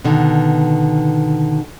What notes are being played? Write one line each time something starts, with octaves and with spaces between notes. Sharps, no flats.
B2 D3 D#3